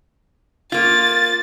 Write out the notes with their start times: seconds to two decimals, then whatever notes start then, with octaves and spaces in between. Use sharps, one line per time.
0.72 A#3 F4 A6